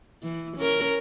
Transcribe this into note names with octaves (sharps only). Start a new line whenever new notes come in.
E3
C#4 A#4